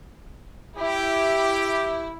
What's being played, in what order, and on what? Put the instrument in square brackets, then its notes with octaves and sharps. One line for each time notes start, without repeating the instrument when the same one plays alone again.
[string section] E4 [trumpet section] G4